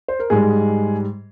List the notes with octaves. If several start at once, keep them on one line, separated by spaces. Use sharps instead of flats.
C5
A#4
G#2 G3 G#3 G#4